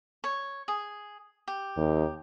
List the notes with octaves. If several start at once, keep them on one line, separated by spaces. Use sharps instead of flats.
C#5
G#4
G4
D#2